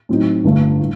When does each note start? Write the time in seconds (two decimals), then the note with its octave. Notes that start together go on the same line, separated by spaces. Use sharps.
0.09 A2 F#3 C4 D#4
0.44 G1 G2 D3 A3
0.79 A2